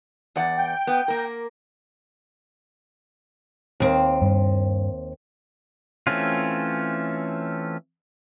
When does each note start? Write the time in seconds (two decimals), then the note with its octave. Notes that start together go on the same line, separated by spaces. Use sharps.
0.36 E2 D5 F#5
0.58 G5
0.87 B3
1.08 A#3 A#4
3.80 D#2 C4
4.22 G2
6.07 E3 A3 C4 C#4 F4